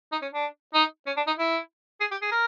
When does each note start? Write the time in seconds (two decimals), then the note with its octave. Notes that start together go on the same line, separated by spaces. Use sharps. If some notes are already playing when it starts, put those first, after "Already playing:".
0.12 D#4
0.22 C#4
0.33 D4
0.74 D#4
1.06 C#4
1.17 D4
1.27 D#4
1.38 E4
2.00 G#4
2.11 G4
2.22 G#4
2.32 A#4